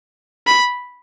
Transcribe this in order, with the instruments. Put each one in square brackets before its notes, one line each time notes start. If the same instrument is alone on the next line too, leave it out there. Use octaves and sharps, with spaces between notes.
[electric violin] B5